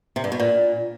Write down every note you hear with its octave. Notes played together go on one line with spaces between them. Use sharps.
C3
G2
B2
A#2